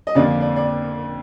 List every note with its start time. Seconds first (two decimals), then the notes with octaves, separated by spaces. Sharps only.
0.07 D#5
0.15 F2 D3 F3 A#3 F4 D5
0.41 D5
0.56 D5